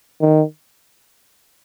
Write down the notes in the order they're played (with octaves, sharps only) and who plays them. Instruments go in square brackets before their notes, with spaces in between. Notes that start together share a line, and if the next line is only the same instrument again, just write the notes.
[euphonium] D#3